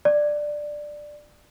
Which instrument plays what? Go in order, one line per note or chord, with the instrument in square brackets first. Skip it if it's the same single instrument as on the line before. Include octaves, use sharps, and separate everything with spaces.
[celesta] D5